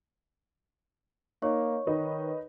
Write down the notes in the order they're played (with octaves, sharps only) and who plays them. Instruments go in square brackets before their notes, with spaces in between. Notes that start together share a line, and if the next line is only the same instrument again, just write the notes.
[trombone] A#3 [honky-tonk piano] D#4 [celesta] C#5 C#6
[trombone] D#3 [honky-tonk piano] D#4 B4 D#5